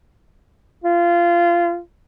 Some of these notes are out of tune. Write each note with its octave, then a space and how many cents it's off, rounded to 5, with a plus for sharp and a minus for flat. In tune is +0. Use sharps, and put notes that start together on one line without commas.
F4 -20